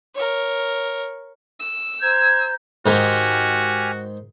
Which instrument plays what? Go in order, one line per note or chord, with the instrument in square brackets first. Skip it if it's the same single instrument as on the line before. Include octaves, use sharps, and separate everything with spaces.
[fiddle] A#4 C#5
[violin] E6
[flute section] C5 A#5 G6 [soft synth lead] G#6
[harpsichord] G#2 D#3 G#3 [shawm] F#4 [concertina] G4 G#5 F6